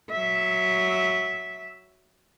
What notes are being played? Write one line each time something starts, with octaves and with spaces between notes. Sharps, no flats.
F#3 E5